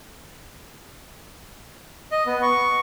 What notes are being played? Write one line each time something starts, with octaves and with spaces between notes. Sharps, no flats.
D#5
B3
C#6